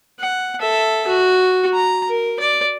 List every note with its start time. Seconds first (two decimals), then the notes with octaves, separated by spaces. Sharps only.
0.19 F#5
0.60 A4 E5
1.07 F#4
1.74 A#5
2.08 A#4
2.39 D5